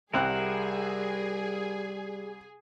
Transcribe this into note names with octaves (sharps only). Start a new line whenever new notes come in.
C2 G3 C4 G#4 A#4 E5 F#5 F#6